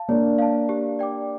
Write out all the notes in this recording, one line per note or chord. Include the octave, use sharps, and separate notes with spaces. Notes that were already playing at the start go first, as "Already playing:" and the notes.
Already playing: F5 A5
A#3 D4 C#5
F5 A5
G4
D5 G5 D6